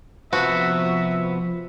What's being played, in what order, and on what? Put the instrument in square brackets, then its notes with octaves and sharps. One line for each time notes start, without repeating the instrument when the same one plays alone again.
[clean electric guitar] C3 B3 B4 [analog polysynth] F3 [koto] F#4 [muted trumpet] E5